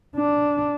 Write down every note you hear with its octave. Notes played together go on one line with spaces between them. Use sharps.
D4